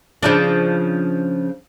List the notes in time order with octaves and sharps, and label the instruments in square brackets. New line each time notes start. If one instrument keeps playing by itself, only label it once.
[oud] C#3 F3 D4